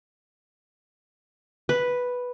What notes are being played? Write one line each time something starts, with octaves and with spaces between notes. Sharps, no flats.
B4